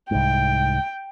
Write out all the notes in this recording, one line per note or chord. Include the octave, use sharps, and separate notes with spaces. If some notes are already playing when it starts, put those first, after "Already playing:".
C2 G#2 G5